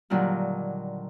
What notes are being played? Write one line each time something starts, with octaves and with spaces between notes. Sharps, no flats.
A#2 D3 D#3 F#3 G3